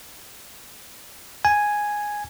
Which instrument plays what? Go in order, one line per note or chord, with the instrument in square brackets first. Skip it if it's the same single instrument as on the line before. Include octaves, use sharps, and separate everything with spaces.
[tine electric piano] G#5